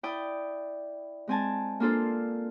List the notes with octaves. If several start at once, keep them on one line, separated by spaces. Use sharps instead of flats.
E4 D5 G5 D#6
G#3 C4 G#5 A5
A#3 D4 F4 A4 C5